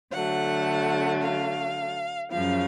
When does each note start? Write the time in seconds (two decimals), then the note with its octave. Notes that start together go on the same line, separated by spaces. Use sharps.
0.13 D3 F#3 A3 F#5
1.22 F5
2.31 F#2 C#3 F3 F5